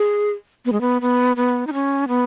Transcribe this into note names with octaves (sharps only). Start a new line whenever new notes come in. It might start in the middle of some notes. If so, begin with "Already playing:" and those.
Already playing: G#4
B3
G#3
B3
B3
B3
D#4
C#4
B3